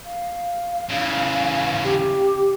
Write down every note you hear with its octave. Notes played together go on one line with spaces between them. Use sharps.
F5
C#3 E3
G4